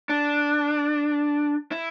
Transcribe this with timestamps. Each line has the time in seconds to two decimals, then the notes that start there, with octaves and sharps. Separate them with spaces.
0.09 D4
1.71 E4